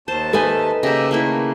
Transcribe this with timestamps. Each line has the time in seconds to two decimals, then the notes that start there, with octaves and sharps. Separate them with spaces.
0.08 D#2 C5 A5
0.33 D#4 A4 B4 D#5 E5 G#5
0.83 C#3 A#3 G4 D#5 E5
1.11 D#3 A3 A#3 E4